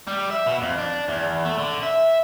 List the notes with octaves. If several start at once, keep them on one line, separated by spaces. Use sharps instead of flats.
G3
E5
B2
F2
D4
E2
A3
D3
E5